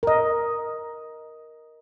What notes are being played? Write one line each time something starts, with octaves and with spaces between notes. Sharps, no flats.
A#4 D#5